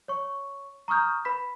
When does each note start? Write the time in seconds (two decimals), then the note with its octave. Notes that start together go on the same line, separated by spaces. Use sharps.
0.08 C#5 C#6
0.88 A#5 C#6 D#6 F6 G6
1.25 B4 B5 B6